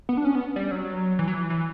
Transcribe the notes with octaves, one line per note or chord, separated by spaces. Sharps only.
B3
D4
C#4
B3
G3
F#3
E3
F#3
E3
E3